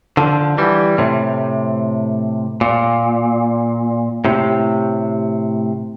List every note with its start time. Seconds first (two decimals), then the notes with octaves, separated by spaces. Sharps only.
0.17 D3 F3
0.58 E3 G3
0.98 A2 C3
2.61 A#2
4.25 A2 C3